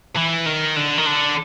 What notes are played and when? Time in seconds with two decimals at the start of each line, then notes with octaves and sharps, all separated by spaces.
0.16 E3
0.46 D#3
0.76 D3
0.98 D#3
1.06 D3